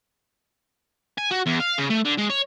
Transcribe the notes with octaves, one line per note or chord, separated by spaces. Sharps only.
G#5
F#4
E2
F5
C#3
A3
D3
G#3
C#5